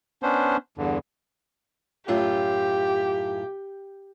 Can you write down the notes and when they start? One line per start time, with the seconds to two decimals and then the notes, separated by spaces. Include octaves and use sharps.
0.23 B3 C#4 D4 C5
0.78 E2 G2 D3
2.08 F#2 A2 F4 G4